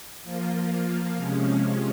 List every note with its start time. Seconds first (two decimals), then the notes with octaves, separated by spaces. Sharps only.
0.23 F3 A#3 F4
1.16 C3 F3 G#3 C#4